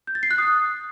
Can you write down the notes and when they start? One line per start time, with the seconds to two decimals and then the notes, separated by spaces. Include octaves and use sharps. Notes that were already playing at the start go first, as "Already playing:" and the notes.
0.07 G6
0.15 A6
0.23 C7
0.31 F#6
0.38 D#6